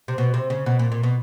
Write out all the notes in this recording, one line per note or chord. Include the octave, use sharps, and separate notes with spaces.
C3
B2
C3
C#3
B2
A#2
A#2
B2